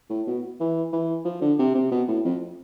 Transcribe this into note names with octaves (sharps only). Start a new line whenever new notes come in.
A2
B2
E3
E3
F3
D3
C3
C3
B2
A2
F2